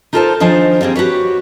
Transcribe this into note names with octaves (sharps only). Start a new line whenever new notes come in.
D#4 F4 A4 A#4 C5 A5
D#3 F3 D4 D#4 C5 G#5
G3 A#3 C4 G#4
F#4 G4 B4 C#5